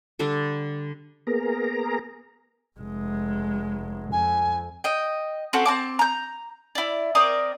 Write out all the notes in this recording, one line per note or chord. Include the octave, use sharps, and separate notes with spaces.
D3 G3 D4 A4
A#3 B3 G#4 A#4 A#5
F1 G#3
F2 G#5
D#5 G5
C4 C#4 F#4 A4
C4 A5 D6
A#5 G6
E4 D5
C4 A#4 D5 D#6